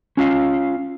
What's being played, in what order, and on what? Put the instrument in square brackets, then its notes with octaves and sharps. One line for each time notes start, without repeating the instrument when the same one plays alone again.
[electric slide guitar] C#4 F4 F5